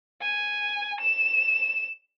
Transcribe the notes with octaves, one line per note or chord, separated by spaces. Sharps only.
G#5
E7